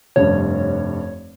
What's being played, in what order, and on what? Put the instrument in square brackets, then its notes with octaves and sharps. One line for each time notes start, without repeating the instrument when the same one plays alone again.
[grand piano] F1 G2 [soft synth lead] C#5